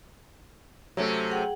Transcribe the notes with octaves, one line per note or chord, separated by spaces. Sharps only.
C3 F#3 A3 C#4
G#4 F#5 G5